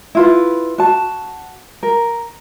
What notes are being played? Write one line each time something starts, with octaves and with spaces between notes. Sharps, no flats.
E4 F4 B4
F#4 A5
A#4